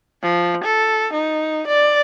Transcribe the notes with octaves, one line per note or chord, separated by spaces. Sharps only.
F3
A4
D#4
D5